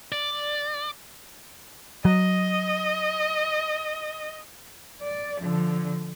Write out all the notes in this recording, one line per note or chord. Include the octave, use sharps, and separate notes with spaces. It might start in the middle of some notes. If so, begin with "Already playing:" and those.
D5
F#3 D#5
D5
D3 F3